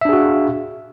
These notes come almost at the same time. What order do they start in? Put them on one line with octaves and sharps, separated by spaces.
E5 D4 G#4 F#4 F5